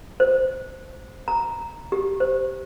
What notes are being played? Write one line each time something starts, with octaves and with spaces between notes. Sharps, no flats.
C5
A#5
G4
C5